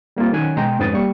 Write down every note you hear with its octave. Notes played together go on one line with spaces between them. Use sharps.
G3 A#3 C4 F4
D#3 F#3 C#4 G#5 F#6
B2 G#3 D#5 G5 A#5 C6
F2 G#2 C#4 B4 D#6 A6
G3 A#3 C#6